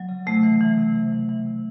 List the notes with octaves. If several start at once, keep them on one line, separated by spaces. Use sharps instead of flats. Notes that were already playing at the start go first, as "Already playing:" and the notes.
Already playing: F#3
C#3
C3 A3
E3
E3
C3
C3
E3
E3
C3